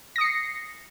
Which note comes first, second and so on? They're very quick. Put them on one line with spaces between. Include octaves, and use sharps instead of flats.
A#6 D#6 C#7 C7